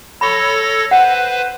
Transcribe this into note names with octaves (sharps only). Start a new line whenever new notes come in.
A4 C#5 B5 C#6 A#6
B4 C5 F#5